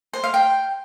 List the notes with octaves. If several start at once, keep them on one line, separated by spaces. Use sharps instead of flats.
C5
F5
G5